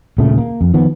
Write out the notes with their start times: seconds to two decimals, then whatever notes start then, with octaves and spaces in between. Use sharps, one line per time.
0.18 D#1 A#2 C#3 A3
0.38 A#3
0.61 F2
0.74 D#3 F3 B3